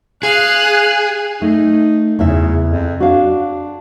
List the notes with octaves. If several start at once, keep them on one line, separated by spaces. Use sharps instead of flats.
G#4 F5 F#6
A3 D#4
E2 C#3 E3 E5
F2
D4 F#4 F5